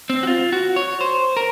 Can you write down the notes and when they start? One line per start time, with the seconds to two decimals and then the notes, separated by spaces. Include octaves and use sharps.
0.10 C4
0.23 F#4
0.27 F4
0.52 F#4
0.76 C#5
1.01 C5
1.37 A#4